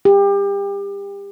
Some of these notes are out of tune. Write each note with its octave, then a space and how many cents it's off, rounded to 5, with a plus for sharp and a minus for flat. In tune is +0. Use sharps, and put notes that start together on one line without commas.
G4 +30